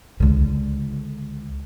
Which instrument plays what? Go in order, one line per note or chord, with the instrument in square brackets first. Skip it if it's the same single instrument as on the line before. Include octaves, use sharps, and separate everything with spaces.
[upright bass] C#2 D3